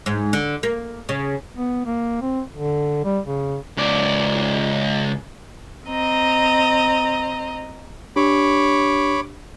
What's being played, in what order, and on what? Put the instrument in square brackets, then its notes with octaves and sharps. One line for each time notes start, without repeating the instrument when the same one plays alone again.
[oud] G#2
D3
A#3
C#3
[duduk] B3
A#3
C4
D3
G3
C#3
[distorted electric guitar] C#2 D5
[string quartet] C4 D#5 A#5
[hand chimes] D4 G4 [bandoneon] C#5 B5 D6